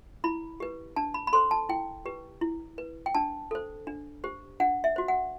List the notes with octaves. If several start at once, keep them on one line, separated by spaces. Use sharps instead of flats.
E4 B5
G4 B4
D4 A5
B5
B5
A4 C5 C6
A5
E4 G5
G4 B4
E4
B4
G5
D4 A5
A4 C5
D4
G4 C5
D4 F#5
E5
F#4 C5
F#5